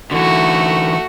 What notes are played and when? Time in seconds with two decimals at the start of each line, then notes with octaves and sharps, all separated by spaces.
0.11 D3 E3 A3 F#4